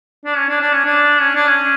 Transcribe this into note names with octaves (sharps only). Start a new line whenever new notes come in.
D4
C#4
D4
D4
C#4
D4
C#4
D4
C#4